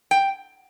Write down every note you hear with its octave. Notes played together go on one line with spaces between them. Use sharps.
G5